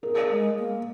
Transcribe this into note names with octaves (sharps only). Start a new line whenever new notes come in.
G#4 A#4
G#3
A#3